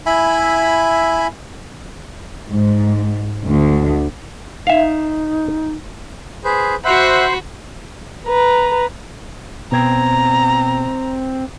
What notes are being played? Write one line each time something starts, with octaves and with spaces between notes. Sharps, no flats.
E4 E5 G#5 B5
G#2
D2
D#4 E5 F5
G#4 B4 C5
F#4 C5 E5 F#5 B5
B4 A#5
B2 B3 C4 A#5 G#6